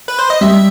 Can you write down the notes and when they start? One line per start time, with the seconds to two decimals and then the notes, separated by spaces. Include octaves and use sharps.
0.08 B4
0.19 C5
0.30 D#5
0.41 G3 E5